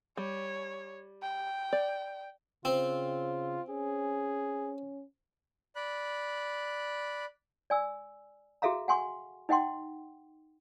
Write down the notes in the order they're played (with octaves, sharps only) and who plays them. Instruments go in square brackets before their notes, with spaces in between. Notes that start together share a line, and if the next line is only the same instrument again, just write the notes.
[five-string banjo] G3 [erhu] C#5
[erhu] G5
[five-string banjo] D5
[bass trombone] C#3 [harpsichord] C4 [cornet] F4
[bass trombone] C#4 [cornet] G#4
[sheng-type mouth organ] D5 B5 F#6
[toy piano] D5 G#5 E6
F#4 G#4 A4 E5 F5 A#5
F#5 G#5 C6 C#6
D#4 D#5 F#5 G5 C6